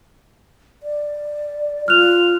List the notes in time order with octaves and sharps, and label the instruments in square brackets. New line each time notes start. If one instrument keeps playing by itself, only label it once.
[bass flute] D5
[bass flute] F4 [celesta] F6 F#6 F7